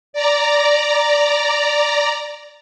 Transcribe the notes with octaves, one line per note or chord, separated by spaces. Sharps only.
D5 A#5